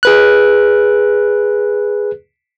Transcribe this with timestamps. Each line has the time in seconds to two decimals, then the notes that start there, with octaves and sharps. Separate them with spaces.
0.03 G#4 B4 F#6